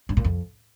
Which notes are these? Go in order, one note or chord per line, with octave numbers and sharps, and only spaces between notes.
G2
A#2
F2